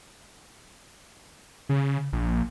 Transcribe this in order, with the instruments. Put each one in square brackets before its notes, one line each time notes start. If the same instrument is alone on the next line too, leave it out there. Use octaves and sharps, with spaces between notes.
[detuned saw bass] C#3
A#1